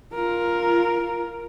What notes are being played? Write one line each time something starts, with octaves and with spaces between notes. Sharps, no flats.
F4 A#4